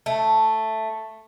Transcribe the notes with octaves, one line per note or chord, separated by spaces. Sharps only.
A3